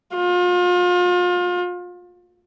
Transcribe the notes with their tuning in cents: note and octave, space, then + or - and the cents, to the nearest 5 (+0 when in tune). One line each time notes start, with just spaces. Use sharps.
F4 +35